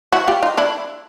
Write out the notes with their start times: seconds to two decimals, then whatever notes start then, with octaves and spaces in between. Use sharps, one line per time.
0.12 E4 F#4
0.28 F4 G4
0.43 D#4 F4
0.57 D4 E4